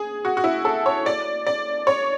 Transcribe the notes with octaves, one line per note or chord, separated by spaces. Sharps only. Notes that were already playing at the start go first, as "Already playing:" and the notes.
Already playing: G#4
F#4
F#4
E4
A4
C#5
D5
D5
C#5